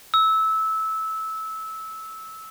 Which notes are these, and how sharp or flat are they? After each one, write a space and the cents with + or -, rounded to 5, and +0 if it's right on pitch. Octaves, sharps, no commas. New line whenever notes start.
E6 -20